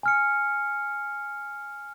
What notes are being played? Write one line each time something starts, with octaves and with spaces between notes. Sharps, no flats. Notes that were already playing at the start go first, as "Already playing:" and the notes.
G#5 F6 C#7